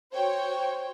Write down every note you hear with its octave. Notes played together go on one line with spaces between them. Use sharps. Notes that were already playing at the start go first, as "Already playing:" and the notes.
F#4 C5 C#5 G5